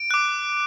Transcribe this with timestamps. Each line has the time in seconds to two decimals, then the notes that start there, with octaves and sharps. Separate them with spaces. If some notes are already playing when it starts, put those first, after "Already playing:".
Already playing: D7
0.11 D6 F#6